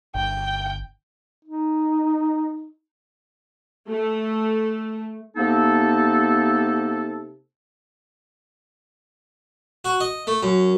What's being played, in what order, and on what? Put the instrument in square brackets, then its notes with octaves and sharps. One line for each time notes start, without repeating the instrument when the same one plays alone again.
[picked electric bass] G1 [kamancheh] G5
[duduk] D#4
[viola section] A3
[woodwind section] C3 A#3 B3 D#4 A4
[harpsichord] F#4
D#5
A3
F#2